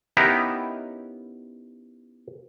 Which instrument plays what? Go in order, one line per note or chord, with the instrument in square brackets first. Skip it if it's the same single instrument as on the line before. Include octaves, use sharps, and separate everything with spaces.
[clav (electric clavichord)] B3 C#4 D#4 E4 G4 A#4